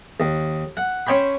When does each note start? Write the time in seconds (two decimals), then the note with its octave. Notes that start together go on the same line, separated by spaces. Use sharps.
0.20 D#2
0.77 F#5
1.07 C#4 C5 C#5 G5 B5